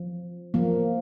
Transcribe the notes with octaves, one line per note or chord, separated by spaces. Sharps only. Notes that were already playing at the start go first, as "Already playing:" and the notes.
Already playing: F3
F3 A#3